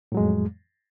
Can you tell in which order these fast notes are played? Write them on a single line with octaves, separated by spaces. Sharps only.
A2 F#3 G#3 F2